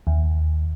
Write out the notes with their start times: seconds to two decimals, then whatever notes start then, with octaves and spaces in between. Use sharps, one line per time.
0.07 D#2